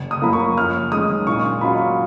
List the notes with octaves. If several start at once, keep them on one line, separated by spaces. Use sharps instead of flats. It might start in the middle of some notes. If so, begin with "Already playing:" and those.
Already playing: F#1
D#6
F#2 F3 A#3 B5
C#6
F#2 F6
D#3 G#3 C#4 D#6
A#2 C#6
F#3 C#4 F4 B5